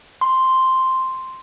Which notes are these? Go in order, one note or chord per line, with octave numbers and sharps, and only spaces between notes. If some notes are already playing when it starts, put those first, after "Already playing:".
C6